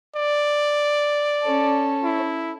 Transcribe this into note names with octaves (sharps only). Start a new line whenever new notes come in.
D5
C#4 A4
E4